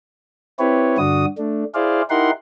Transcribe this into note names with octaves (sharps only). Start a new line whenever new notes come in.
C4 E4 G4 B4 C#5
G2 D3 D4 F#4 D#6
A3 D4
E4 G#4 C5 D5 F5
D#4 E4 G4 A#4 F#5 C6